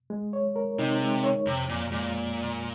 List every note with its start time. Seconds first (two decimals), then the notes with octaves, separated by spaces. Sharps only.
0.10 G#3
0.33 C#5
0.56 A#4
0.79 C3 D#4
1.01 G#3
1.24 C#5
1.46 F2 C3
1.69 F2 A#2
1.91 A#2 G#3